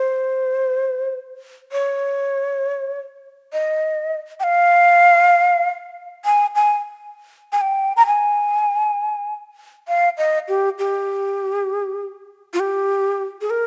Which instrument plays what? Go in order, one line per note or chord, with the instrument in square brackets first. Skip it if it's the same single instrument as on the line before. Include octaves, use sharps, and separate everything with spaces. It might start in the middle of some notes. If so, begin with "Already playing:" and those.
Already playing: [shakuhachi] C5
C#5
D#5
G5
F5
G#5
G#5
G#5
G5
A#5
G#5
F5
D#5
G4
G4
F4
G4
G#4
A#4